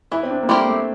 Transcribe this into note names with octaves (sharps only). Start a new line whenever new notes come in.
E3 E4
C4
D4
A#3
G3 A3 C4 G4 A#4
A3